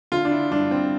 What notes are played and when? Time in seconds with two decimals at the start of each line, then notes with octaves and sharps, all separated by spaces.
0.12 D3 F4
0.25 D4
0.31 E4
0.51 G2 D4
0.71 C4